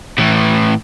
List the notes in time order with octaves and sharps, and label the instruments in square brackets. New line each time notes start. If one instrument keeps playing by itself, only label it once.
[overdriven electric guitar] A2 E3